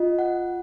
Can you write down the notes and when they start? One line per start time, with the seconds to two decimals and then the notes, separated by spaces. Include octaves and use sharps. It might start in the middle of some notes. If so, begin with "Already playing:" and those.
Already playing: F4 D#5
0.19 F#5